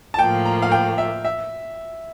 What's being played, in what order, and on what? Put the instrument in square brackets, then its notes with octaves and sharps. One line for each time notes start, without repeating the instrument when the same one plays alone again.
[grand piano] A5
[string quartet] A2 F3 A#3 [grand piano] G5
[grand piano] A#5
F5
G5
E5
E5